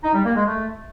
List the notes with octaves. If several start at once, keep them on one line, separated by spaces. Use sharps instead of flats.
D#4
G3
A#3
G#3
A3